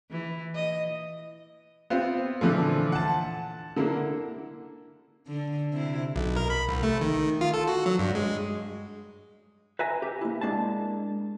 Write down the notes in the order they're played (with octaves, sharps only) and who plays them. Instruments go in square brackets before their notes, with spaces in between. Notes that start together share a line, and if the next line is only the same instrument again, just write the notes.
[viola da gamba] E3
D#5
[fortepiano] B3 C4 F4
[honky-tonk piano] A#2 D3 [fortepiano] E3 F3 A3
[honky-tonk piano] F#5 A5
[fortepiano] D3 A#3 E4
[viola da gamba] D3
C3 E4
[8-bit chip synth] B1
A#4
B5
C2
A3
D#3
F4
A4
F#4
F#3
G2
G#3
[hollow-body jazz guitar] B4 E5 G#5 A#5
G4
A#3 E4
G#3 A#3 D4 A5